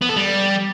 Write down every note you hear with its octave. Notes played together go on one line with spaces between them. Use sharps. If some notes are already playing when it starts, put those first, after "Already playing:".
B3
A4
G3